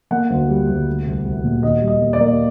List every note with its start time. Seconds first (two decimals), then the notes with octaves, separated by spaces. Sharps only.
0.11 A#3 F#5
0.30 D2
0.49 G3
0.68 D2
0.87 A3
1.06 C2
1.25 C2
1.44 A#2
1.63 D#2 D#5
1.82 G3
1.88 D#5
2.01 A#3
2.13 D5
2.19 A#3